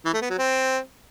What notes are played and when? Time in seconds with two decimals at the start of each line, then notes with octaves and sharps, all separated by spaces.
0.05 E3
0.13 A3
0.22 B3
0.30 F#3
0.38 C4